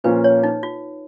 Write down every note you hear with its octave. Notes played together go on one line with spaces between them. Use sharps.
A#2 F3 A#3 C#4 F4 B4
C#5
D#4
F4